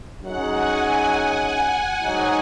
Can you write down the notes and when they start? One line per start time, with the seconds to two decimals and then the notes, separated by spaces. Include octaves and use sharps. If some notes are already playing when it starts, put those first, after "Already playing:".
0.23 F#2 F#3 D#4 G#4 F#5
0.53 G#5
0.83 F#5
1.13 F#5
2.03 G#2 F#3 D#4